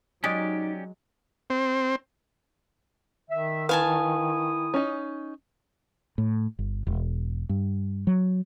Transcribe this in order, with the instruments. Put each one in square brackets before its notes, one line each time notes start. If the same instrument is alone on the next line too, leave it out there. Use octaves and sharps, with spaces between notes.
[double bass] F#3 [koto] G#3 [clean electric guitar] C#4 G4 D5 [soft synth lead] D#4
[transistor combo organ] C4
[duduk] D#3 [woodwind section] E5
[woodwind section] E4 D#6 [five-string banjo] B4 [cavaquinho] F5 G#5 A5
[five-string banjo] C#4 D#4
[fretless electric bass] A2
G1
E1
G2
F#3